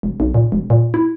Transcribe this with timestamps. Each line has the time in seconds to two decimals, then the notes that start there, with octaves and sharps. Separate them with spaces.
0.03 E1
0.20 B1
0.34 A#2
0.52 E1
0.70 A#2
0.94 E4